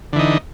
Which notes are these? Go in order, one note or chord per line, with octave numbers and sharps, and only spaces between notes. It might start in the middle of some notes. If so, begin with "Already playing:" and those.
D3 E3 D#4